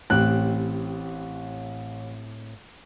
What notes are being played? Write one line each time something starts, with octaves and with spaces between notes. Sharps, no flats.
A1 A2 C4 G4 F#6